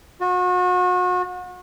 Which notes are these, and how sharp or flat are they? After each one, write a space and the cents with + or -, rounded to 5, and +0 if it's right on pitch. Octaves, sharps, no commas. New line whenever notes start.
F#4 -35